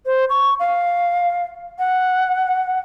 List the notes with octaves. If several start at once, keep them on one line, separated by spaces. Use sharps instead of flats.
C5
C#6
F5
F#5